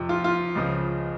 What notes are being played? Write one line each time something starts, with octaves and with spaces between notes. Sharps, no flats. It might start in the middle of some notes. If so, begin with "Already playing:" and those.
Already playing: F2 C3 F3
F4
F4
C#2 C#3 F3